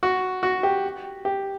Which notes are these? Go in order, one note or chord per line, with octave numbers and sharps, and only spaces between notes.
F#4
F#4
G4
G4